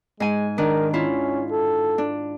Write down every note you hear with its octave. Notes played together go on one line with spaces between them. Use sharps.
G#2 G#3 G#5
D#3 D4 A#4
C#4 E4 F4
A4
D4